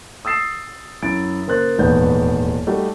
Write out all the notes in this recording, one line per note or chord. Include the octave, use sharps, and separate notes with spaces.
D#6 E6 A6 C7 E7
F#2 E4 A6 D7
C#3 A#3 C5 F#6 A6
D#1 E2 G#2 B3 D5 G6
G3 A3 D#4 F#4 G4 A4